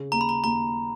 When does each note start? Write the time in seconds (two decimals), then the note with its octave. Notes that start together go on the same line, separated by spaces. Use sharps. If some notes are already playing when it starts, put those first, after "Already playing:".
Already playing: C#3
0.12 D#2 A#5
0.21 B5
0.29 A#5
0.44 D#2 A#5